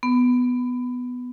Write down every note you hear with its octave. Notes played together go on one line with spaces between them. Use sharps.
B3